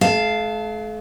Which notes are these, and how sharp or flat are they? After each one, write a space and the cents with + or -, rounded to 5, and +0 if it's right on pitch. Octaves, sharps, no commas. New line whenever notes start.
A3 -45 F5 -5 A5 +0